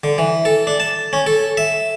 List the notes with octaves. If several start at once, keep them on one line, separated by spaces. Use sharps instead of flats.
D3
E3
A4
D4
A5
C#4
A4
E5